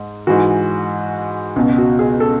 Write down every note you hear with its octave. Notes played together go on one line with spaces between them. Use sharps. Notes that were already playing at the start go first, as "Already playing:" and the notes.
Already playing: G#2
G#2 E3 F#4
C#2 B2
F#4
G#4
A4